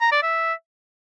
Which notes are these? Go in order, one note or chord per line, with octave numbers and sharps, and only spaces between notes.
A#5
D5
E5